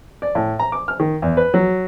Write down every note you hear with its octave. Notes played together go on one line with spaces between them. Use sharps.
D5
A2
A#5
D6
F6
D#3
E2
B4
F#3